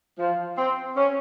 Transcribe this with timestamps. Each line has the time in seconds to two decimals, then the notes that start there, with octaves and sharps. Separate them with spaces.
0.19 F3
0.58 C4
0.96 C#4